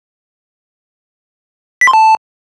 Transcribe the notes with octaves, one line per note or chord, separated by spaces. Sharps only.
B6
C6
A5